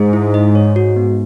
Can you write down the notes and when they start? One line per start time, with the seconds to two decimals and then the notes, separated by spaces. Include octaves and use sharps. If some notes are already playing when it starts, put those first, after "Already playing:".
Already playing: G#2 G#4
0.13 E4
0.34 D#5
0.55 C#5
0.76 F#4
0.96 B3